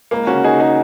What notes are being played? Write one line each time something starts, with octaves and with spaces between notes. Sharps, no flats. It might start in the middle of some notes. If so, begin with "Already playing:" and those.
C#2 A#3
C#4 F#4
C#3
D#4 G#4
C#3
D#4 G#4